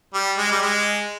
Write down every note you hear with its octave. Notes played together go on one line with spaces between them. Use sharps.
G3
G#3
G3
G#3